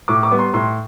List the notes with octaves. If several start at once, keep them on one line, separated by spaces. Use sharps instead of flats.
A2 D6
D6
G3 B3
C6
A2 C6